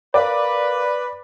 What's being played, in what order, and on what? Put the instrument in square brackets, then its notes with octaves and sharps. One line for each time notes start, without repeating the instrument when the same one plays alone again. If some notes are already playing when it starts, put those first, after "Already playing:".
[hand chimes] A#4 F5 [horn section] B4 [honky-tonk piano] D5